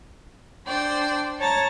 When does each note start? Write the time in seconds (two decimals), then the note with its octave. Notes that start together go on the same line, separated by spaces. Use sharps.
0.67 D4 C5 D5 G5
1.39 C#5 A5 A#5 A6